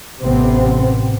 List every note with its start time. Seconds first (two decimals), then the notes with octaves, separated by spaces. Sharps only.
0.20 A1 C3 B3 C4